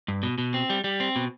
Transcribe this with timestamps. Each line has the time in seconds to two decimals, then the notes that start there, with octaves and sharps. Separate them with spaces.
0.08 G2
0.23 B2
0.38 B2
0.54 C4
0.70 G3
0.84 G3
1.00 C4
1.16 B2